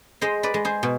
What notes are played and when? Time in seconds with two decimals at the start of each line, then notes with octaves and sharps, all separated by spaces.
0.21 G#3 C5 D#5
0.43 B4 D5
0.54 G#3
0.65 G#4 C5
0.83 B2